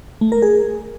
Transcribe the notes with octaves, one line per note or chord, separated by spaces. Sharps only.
A3
A#4
G#4